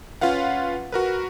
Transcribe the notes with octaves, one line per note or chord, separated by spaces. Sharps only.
C#4 F4 B4 F5 F#5
F#4 A#4 B4